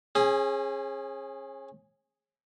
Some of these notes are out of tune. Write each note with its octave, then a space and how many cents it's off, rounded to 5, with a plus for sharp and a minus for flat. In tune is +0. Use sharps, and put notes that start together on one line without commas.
C#4 -35 G#4 +0